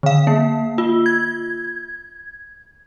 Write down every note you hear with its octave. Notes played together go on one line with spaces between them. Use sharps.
D3 F5
A#3
F4
G#6